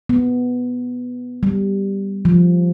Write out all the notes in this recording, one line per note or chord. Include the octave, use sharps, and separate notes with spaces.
B3
G3
F3